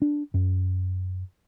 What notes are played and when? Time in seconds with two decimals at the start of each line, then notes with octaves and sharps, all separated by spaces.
0.02 D4
0.34 F#2